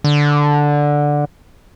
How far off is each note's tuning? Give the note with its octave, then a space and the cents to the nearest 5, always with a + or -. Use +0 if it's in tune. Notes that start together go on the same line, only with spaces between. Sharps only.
D3 +0